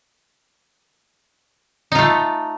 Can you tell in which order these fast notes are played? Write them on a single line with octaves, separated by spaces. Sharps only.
D#4 F4 A3